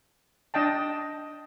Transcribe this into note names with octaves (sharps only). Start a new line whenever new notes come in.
D4 D#5 G5 A5